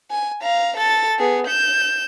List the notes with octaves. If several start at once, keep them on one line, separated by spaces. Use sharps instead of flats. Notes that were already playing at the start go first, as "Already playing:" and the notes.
G#5
F5 A#5
A4 A6
B3 G#4
G6 E7